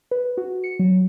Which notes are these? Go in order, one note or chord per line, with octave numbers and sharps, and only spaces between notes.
B4
F#4
C#7
F#3